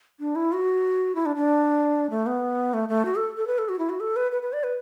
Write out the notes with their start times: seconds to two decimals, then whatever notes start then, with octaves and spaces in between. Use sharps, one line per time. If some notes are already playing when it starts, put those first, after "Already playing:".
0.20 D4
0.36 E4
0.53 F#4
1.15 E4
1.26 D4
1.36 D4
2.10 A3
2.26 B3
2.74 A3
2.89 A3
3.05 F#4
3.16 A4
3.37 A4
3.47 B4
3.58 A4
3.69 F#4
3.79 E4
3.89 F#4
4.00 A4
4.16 B4
4.32 B4
4.42 B4
4.53 D5
4.63 B4